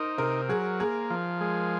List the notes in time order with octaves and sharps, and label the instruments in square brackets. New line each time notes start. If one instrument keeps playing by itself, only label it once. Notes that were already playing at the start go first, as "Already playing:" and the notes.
Already playing: [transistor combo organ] D#4 [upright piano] A#4 C5
[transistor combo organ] C3 [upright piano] A#4
[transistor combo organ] F#3 [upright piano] G#4
[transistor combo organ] A#3 [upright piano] G#4
[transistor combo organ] F3
G#3